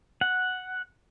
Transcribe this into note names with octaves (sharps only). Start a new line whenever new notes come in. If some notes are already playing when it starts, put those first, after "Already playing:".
F#5